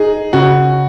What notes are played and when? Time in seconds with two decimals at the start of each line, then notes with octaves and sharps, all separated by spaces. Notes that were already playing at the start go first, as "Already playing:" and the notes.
Already playing: D#4 G#4
0.33 C#3 F#4